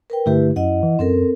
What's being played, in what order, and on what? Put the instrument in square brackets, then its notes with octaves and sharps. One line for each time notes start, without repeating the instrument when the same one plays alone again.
[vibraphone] A#4 B4 G5
[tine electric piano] G2 D3 A3 [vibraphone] E4 G4 B4
[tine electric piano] F#2 [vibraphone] E4 D#5 F#5
[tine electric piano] E3
[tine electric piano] F#2 [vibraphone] C4 A4 A#4